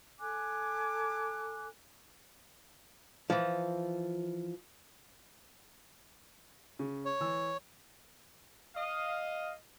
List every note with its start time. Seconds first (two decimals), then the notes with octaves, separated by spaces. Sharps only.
0.20 A4 G#5 D6 F#6
3.30 E3 F3
6.79 C#3
7.05 C#5
7.21 E3 E6
8.75 D#5 F5